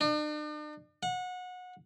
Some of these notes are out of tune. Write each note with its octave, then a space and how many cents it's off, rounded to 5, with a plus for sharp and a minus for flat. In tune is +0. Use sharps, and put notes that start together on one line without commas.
D4 +45
F#5 -25